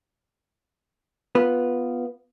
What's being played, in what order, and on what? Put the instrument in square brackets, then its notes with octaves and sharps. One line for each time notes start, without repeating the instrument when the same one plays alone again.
[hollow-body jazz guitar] B3 F4 B4